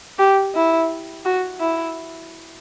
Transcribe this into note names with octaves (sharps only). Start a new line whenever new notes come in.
G4
E4
F#4
E4